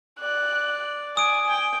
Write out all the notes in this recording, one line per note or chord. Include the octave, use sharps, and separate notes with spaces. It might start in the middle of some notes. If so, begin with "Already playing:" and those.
D5 F#6
G#5 D#6 D7
G5